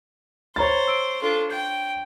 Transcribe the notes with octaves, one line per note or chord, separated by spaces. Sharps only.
C5 C#5 A#5 B5 A6
E6 D7
D4 F4 A4
G5 G6